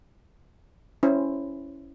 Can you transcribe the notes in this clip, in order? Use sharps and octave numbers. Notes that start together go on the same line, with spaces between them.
C#4 E4 C5